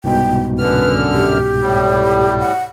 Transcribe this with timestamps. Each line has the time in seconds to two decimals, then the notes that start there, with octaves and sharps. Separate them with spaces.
0.04 C2 G#2 B2 G5
0.58 F#2 D3 B4 F6
1.13 G4
1.60 A2 G3
2.40 F#5